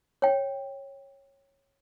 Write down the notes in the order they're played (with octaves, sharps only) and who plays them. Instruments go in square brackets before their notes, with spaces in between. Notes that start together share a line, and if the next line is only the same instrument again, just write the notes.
[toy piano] C#5 G5